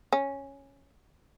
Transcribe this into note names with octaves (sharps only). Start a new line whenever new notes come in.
C#4